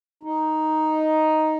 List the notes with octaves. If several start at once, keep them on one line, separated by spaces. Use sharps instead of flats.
D#4